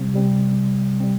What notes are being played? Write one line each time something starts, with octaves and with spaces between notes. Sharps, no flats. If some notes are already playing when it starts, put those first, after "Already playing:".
Already playing: C3 G3 C4
C3 G3 C4
G3 C4